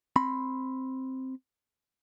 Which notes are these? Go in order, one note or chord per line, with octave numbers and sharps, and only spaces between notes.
C4 B5 C6